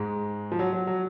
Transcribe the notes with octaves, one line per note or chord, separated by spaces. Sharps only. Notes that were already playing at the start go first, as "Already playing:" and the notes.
Already playing: G#2 G#3
F3
F#3
F#3
F#3